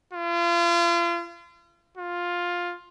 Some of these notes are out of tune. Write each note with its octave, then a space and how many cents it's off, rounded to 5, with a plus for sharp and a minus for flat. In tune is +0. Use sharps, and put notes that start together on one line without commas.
F4 -35
F4 +10